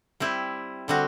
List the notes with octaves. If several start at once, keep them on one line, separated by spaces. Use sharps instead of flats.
G3 C4 E4
D3 G3 C4 F#4